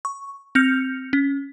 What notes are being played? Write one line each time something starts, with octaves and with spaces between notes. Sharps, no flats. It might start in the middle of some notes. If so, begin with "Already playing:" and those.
C#6
C4 F6 G6 C#7 F7
C#4